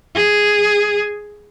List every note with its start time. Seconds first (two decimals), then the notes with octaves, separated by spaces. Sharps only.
0.15 G#4